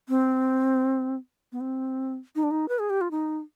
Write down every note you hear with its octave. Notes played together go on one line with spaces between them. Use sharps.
C4
B3
C4
D#4
D4
D#4
B4
G#4
G4
F4
D#4